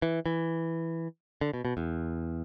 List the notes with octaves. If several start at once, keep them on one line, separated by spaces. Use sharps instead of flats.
E3
E3
D3
B2
B2
E2